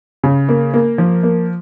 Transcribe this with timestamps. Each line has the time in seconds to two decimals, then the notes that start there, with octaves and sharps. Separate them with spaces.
0.24 C#3
0.49 A#3
0.74 A#3
0.98 F3
1.23 A#3